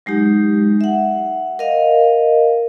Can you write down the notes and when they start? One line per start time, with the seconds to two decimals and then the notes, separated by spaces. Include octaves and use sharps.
0.06 F#3 G#3 D#4 G4
0.81 E5 F#5
1.59 A#4 D#5 F5